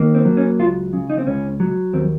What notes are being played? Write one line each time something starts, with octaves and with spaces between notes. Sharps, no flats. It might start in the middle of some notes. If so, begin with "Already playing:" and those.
Already playing: D#3 A#3
C4
F#3
C#4
C#2 F4
C#3
D#4
C4
C#2 C#4
F#3
D#2 C4